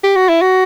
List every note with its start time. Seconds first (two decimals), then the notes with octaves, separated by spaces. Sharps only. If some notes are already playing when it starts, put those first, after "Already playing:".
0.04 G4
0.16 F#4
0.29 E4
0.42 F#4